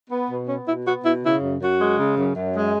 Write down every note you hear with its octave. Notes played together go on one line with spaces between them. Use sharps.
B3
B2
B3 C#4
B2 E4
B3 F#4
B2 E4
C#3 E4
F#2
F#2 F#4
G#3
C#3
F#2
F#2
G#3